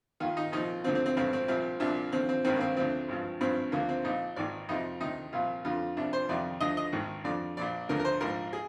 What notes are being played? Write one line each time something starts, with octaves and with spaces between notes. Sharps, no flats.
D#2 D#3 F4
D#4
C2 A#2 F3 D#4
D2 D3 F3 C4
C4
C4
G#1 G2 D3 F3 C4
C4
C2 A#2 F3 C4
C2 A#2 F3 D4
D#2 D3 F3 C4
C4
G#1 G2 D#3 C4
A#3
C4
D2 D3 F3 C4
G#1 G2 F3
G#1 G2 F3 C4
D2 D3 F3 A#3
C4
A#1 A#2 F3 D#4
G#1 G#2 D#3 D5
F2 C3 F3 D#4
D2 C3 D#3 D#4
C2 A#2 F3 F4
F2 D3 F3 F4
C2 C3 F3 D4
C5
F2 C3 D#3 D5
D2 D3 F3 D#5
D#5
G#1 G#2 D#3
F2 D3 F3 D5
A#1 A#2 F3 D5
D2 D3 F3 A#4
A#4
C5
A#1 G#2 F3 A#4
G#4